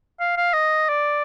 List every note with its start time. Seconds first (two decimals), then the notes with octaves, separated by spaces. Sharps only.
0.20 F5
0.37 F5
0.53 D#5
0.89 D5